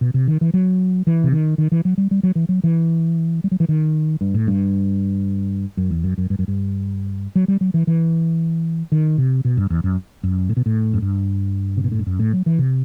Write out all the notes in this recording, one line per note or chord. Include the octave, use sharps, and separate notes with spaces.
B2
C3
D#3
E3
F#3
E3
C3
D#3
D#3
E3
F#3
G3
G3
F#3
E3
F#3
E3
G3
F#3
E3
D#3
G2
A2
G2
F#2
E2
F#2
F#2
G2
F#2
G2
F#3
G3
F#3
E3
E3
D#3
C3
B2
G2
E2
F#2
F#2
A2
B2
A2
F#2
G2
C3
B2
A2
G2
F#2
A2
F#3
E3
C3